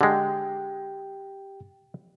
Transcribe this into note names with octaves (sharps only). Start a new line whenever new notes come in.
D3 G#3 G4 G5